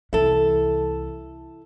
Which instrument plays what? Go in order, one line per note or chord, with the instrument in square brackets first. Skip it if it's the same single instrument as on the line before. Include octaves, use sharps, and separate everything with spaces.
[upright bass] C2 E3 [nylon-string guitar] E4 A4